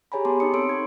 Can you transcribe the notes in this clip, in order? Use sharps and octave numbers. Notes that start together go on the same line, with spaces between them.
G4 G#4 C#5 G#5 A#5 B5
B3 C#5 A5 C6 D6
D#4 C#5 D#6 C#7
C4 A4 C#5 C6 E6 D7
C#6 G#6